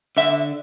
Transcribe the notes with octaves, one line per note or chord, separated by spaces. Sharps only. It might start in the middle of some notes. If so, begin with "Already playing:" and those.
D3 E5